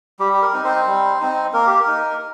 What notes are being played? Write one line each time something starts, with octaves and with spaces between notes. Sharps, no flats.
G3 G4
G4
A#4
C4 D#4
C4 C5
G3
C4 D#4
A#3 A#4
G4
A#4
D#4